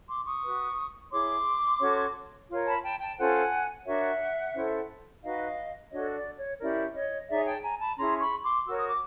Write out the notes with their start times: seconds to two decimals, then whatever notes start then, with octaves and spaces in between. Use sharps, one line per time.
0.08 C6 D6
0.26 C#6 D#6
0.43 F#4 B4
1.11 E4 G#4 C#5 C6 D6
1.80 C#4 F#4 A4 C#5
2.50 F4 A#4 C#5
2.67 A5 B5
2.83 G5 A5
3.00 G5 A5
3.18 C#4 F4 A4 C5 F#5 G#5
3.86 D4 F#4 A#4 C#5 E5 F#5
4.55 C#4 E4 A4 C5
5.23 D#4 F#4 B4 D#5 F5
5.91 D4 F#4 A4 C#5 D#5
6.15 D5
6.38 C#5
6.60 C#4 E4 G4 A#4 D5
6.95 C#5 D#5
7.29 D#4 G#4 C#5 D5 E5
7.46 G5 A5
7.63 G#5 A#5
7.80 A5 B5
7.98 C#4 E4 G#4 A#5 C6
8.21 B5 C#6
8.43 C6 D6
8.66 F#4 A#4 C#5 E6
8.77 D#6
8.89 D6